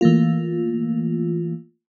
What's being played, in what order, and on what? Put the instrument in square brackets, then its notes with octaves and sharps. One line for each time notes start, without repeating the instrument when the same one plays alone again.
[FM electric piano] E3 A3 A#3 F4